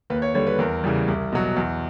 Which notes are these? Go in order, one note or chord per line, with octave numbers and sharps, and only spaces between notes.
D#2 B4
C#5
D3 G3 C#5
B4
E2 A#4
C#3 E3 G3
C2
B2 F#3
E2